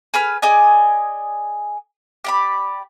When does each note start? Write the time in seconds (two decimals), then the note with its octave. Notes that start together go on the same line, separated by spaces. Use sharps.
0.14 G#4 B4 F6
0.42 G#4 D5 D#5 G#5
2.24 G4 D5 B5